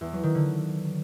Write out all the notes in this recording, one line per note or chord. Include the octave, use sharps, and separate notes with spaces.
E2
F#3
D#3
D3